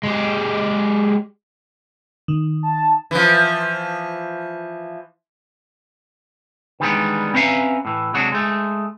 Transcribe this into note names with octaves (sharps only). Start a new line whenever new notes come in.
G#3 G4
D#3
A5
E3 F3
D#3 E3 G3 G#3 B3 D4
C4 C#4 B4 E5 F5 A#5
A2 E3
C3 F#3 G#3 D4 F#4
G#3 A3